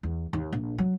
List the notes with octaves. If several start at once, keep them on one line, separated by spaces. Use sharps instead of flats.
E2
D#2
A#1
F#3